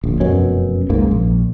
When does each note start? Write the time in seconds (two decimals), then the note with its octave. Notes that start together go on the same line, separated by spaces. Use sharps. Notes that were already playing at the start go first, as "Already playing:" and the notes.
0.04 D1 A#1
0.20 F1 F#2 B2 C#4
0.90 C2 G#2 C#3 A#3
1.11 A#1